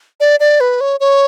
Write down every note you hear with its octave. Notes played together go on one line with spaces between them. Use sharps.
D5
D5
B4
C#5
C#5